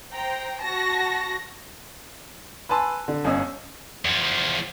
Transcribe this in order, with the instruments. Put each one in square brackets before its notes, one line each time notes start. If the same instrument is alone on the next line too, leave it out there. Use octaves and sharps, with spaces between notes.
[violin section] C5 G5 A#5
F#4 A5 A#6
[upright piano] B4 G#5 A5 C6 E6
D3
G1 C#4 D#5 E6
[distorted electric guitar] E2 F3